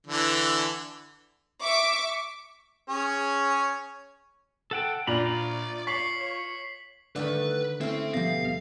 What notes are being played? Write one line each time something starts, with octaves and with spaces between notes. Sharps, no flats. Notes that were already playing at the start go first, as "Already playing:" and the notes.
D3 E3
E5 C#6 D6 D7
C#4 G#4 C#5
A4 F#5 G5
A#2 D4 F4 D5 A#5 B5
C#5 C#6 B6 C7 F#7
C#5
D3 D#3 A3 B4 D5
A3 C4 C#4 E4
B2 F3 G3 B3 F5 A#6